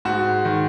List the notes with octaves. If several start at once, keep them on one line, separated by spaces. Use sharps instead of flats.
G#2 F#4
D#3